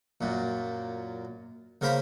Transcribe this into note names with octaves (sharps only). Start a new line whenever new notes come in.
F#2 A#2
C#3 A#3 A#4 C5 B5